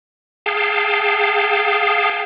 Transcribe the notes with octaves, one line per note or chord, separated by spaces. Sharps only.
G#4 F5 G5 A5